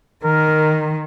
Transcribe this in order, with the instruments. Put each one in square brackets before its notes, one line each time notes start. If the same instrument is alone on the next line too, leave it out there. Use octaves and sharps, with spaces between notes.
[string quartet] D#3 [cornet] A#4